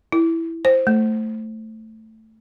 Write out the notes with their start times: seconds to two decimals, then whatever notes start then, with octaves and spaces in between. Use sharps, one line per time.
0.12 E4
0.65 C5
0.87 A3